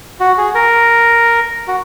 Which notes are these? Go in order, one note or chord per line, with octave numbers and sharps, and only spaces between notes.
F#4
G#4
A#4
F#4